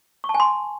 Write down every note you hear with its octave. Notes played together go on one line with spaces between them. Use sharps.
C#6
A5
G#5
C6